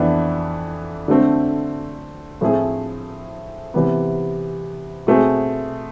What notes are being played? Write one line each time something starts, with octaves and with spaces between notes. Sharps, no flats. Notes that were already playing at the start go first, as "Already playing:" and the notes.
Already playing: F2 E3 B3 D4
D3 A3 C4
A2 F3 A3 C4 G#4
C3 E3 B3
B2 A3 C4 G#4